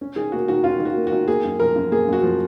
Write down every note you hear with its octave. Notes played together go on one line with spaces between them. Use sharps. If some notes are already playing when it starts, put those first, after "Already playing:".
C#4
D#3 G#4
A#3 F#4
D#3 F#4
C#4 F4
D#3
F#4
A#3
F#4
D#3
A#3 G#4
F#2
F3 A#4
F#2
A#3 G#4
F#2 F#4
F3